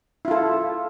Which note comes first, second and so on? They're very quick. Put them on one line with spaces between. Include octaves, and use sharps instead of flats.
E4 F4 A4